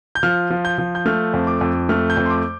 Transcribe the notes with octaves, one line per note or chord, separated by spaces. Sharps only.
G6
F3 F6
F3
G6
F3
G6
A3 F6
F2
D6
F2
A3 F6
G6
F2
C6
D6